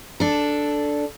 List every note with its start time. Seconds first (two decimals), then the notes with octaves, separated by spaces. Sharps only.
0.20 D4 A4